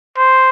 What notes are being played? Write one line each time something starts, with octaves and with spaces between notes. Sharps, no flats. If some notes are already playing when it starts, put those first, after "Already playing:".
C5